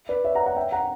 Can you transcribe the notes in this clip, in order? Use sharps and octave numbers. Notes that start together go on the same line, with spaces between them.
B4 D5
C#5 E5
F#5 A#5
F#5 A#5
E5 G5
F#5 A#5